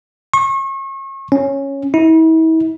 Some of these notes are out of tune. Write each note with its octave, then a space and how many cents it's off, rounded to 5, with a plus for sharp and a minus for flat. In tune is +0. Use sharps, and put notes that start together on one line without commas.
C#6 -35
C#4 -5
E4 -40